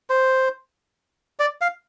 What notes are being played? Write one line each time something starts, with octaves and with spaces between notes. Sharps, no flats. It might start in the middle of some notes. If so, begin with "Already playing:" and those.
C5
D5
F5